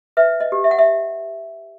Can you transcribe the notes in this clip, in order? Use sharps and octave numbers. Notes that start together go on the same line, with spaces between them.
B4 E5
D#5
G4
E5
F#5
E5